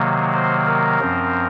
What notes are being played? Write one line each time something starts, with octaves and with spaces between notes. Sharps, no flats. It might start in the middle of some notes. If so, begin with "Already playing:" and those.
Already playing: C3 D#3 F#3 A#3
C5
A#4
F#2 F3 C4